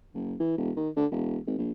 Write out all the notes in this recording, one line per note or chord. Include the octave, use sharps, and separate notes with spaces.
F#1
E3
E1
D#3
D3
E1
G#1
A#1